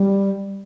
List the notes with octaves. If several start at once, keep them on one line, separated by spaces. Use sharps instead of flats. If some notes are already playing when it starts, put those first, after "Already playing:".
Already playing: G3